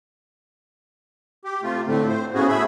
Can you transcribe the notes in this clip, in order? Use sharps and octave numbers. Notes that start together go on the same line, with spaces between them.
G4
C3 A3 F4
A2 D3 A3 C4
C5
A2 C#3 B3 C#4 F#4 G#4
A3 G#4 E5 B5